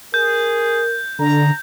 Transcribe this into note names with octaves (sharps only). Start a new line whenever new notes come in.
G#4 A#4 G6
D3 D4 A#5